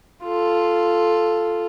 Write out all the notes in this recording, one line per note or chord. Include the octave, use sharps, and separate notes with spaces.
F4 A4